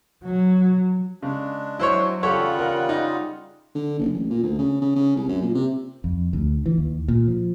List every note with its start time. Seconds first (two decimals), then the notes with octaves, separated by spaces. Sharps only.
0.24 F#3
1.23 C#3 G#3 D4
1.79 F#3 E4 C5 C#5
2.23 C#3 G3 F4 G4 A4 C#5 F#5
2.59 A#4
2.89 D#4
3.75 D3
3.99 F#1
4.14 A1
4.30 A#2
4.43 D2
4.58 C#3
4.81 C#3
4.96 C#3
5.16 C2
5.28 F#2
5.42 A#2
5.55 C3
6.04 F2
6.33 D2
6.66 E3
6.78 D#2
7.08 A#2
7.28 F3